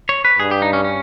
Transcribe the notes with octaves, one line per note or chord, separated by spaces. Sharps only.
C#5
B4
G2 G#4
G4
D#4
C#4
C#4